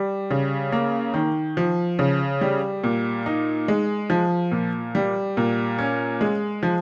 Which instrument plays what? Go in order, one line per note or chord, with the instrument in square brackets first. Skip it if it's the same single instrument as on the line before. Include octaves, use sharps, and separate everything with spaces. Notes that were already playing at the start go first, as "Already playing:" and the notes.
Already playing: [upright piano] G3
C#3
A#3
D#3
F3
C#3
G3
A#2
D#4
G#3
F3
A#2
G3
A#2
C#4
G#3
F3